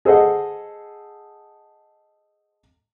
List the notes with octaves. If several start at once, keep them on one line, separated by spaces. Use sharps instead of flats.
G#4 A4 C5 D#5 F#5